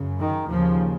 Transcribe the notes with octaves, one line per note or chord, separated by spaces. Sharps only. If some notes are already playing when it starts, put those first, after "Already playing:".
Already playing: F#2 C#3
D#3
D#2 C#3 F3